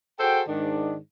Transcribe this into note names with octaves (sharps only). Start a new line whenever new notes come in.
F#4 G#4 A4 C5 G5
G#2 D#3 D4